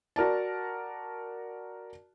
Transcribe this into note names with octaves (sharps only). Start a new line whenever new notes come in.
F#4 A#4 D5 A5